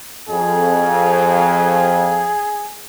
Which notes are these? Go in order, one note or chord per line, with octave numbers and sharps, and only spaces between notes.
F2 G#4